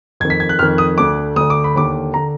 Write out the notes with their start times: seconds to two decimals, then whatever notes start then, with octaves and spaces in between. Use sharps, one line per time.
0.20 F2 G#6
0.25 D#3
0.30 B6
0.40 G#6
0.49 F#6
0.59 F2 D#3 F6
0.78 D#6
0.98 D2 D3 D6
1.36 D2 D3 D#6
1.50 D6
1.64 B5
1.75 D#2 D3 D6
2.14 D3 A#5